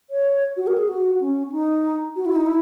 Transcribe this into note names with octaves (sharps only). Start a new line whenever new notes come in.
C#5
F#4
A#4
G#4
F#4
C#4
D#4
F#4
E4
D#4
E4